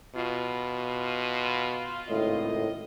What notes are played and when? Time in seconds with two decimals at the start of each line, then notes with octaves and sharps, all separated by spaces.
0.16 B2 F4
2.08 G#1 C#2 A2 D#5